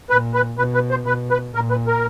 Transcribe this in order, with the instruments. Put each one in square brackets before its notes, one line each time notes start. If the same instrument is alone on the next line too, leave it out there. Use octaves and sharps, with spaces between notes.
[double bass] A#2 [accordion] B4
[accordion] B4
[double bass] B2 [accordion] B4
[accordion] B4
C5
[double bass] B2 [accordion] B4
[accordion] B4
[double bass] A#2 [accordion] A#4
[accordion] B4
A#4